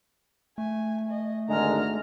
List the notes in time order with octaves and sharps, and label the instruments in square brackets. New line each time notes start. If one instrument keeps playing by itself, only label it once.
[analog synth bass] A3 [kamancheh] G#5
[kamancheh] D#5
[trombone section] G#1 D3 G#3 [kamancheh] A#5 F6